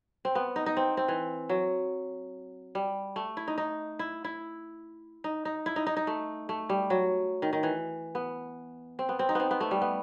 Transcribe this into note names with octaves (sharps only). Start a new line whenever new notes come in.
C4
B3
D#4
D#4
C4
C4
E3
F#3
G3
A3
E4
D#4
D#4
E4
E4
D#4
D#4
E4
D#4
D#4
D#4
A3
A3
G3
F#3
D#3
D#3
E3
B3
C4
B3
C4
D#4
B3 C4
B3
A3
G3
B3